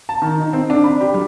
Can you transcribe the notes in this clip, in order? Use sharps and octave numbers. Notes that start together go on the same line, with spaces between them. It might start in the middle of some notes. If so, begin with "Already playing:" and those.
A5
D#3
D#4
C4
D4
B5
G4
G3